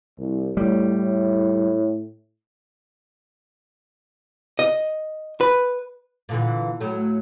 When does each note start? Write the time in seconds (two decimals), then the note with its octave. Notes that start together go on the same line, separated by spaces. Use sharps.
0.18 C2
0.57 A2 G3
4.59 D#5
5.41 B4
6.29 A#2 D3 E3
6.81 A2 F#3 A3